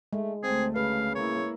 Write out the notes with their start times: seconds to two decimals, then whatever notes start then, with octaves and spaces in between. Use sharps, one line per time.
0.13 G#3 A3
0.43 D2 A3 C4 G#4
0.76 C#3 B4 F5
1.15 A#3 E4 C#5